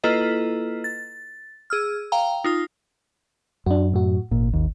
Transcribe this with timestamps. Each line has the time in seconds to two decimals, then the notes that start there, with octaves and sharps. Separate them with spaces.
0.04 A#3 E4 F4 A4 B4 D#5
0.84 A6
1.70 G#4 E6 F6
2.12 F5 G5 A#5
2.44 D#4 F4 D#6
3.66 F#2 D4 F#4
3.94 A2 F#4
4.31 G#1 A#2
4.53 D#2